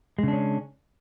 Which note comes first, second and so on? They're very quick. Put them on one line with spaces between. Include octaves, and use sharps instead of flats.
G#3 C#3 D4 C#4